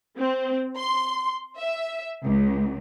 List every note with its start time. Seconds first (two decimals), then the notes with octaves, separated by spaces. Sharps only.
0.18 C4
0.77 C6
1.58 E5
2.23 C#2